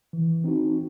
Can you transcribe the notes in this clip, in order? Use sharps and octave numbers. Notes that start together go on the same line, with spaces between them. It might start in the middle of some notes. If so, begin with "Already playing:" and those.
E3
C4 D#4 F#4